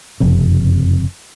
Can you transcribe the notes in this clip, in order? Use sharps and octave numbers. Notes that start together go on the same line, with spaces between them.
F#1 F2 C3